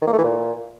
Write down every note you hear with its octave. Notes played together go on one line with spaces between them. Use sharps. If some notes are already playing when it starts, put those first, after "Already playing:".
D#3
A#3
A3
E3
A#2